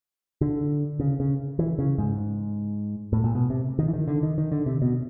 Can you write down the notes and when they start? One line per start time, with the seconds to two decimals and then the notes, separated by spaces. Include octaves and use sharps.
0.41 D3
1.00 C#3
1.20 C#3
1.59 E3
1.79 C#3
1.98 G#2
3.13 A2
3.24 A#2
3.35 B2
3.50 C3
3.79 D#3
3.88 E3
3.93 D#3
4.08 D3
4.23 D#3
4.38 D#3
4.52 D3
4.66 C3
4.82 B2